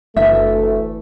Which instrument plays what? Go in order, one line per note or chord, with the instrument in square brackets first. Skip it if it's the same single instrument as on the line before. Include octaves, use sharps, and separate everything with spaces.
[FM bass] F#1 [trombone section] D2 E3 A3 [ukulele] E5